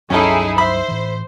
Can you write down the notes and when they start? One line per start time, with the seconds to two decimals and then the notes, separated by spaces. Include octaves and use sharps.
0.10 C#2 G2 F#3 C#4 D#4 E4 G#4 A4
0.58 C5 E5 B5
0.88 A2 E3